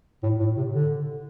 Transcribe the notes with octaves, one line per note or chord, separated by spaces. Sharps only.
A2
A2
C3
D3